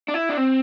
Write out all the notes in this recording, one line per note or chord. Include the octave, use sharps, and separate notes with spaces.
D4
E4
D4
C4